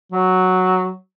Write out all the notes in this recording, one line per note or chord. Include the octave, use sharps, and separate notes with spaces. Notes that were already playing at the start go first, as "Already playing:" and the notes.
F#3